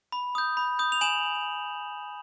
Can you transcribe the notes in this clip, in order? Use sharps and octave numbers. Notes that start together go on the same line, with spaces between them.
B5
D#6 G6
B5
D#6 G6
F7
G#5 E7 F#7